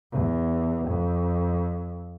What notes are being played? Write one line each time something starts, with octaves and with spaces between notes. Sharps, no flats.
E2
F2